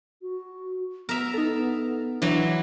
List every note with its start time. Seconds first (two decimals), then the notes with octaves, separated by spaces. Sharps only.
0.22 F#4
1.09 B3 A#4 E5 A#6 F7
1.34 D#4 A4
2.22 E3 F#3 D4